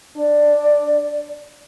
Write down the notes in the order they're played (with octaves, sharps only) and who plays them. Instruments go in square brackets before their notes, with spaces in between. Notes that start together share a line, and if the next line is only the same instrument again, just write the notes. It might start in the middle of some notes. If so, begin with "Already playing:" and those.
[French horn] D4 [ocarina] D5